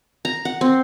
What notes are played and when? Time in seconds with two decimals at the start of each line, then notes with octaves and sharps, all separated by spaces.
0.25 A#5
0.45 F#5
0.61 C4